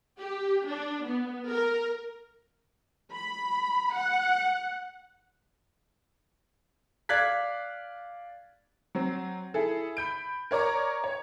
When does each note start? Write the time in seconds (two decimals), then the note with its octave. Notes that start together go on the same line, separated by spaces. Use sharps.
0.19 G4
0.66 D4
1.06 B3
1.49 A#4
3.12 B5
3.94 F#5
7.09 D5 F5 F#6 G#6 B6
8.95 F#3 C4
9.54 E4 G#4 A4
9.97 B5 G6 D7
10.51 A#4 C#5 D5 A#5 C#6
11.04 C#5